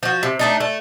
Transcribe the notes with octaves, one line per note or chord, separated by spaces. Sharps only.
F3 F#4
C3
A3 D4 D#4
A3